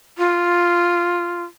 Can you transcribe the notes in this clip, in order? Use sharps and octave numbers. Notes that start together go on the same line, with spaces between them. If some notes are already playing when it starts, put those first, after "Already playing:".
F4